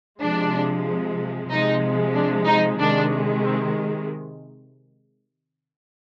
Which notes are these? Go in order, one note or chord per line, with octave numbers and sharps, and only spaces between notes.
C3 F3 G#3 D4
C3 F3 G#3 D#4
D4
D#4
C3 D#3 G#3 D4
C4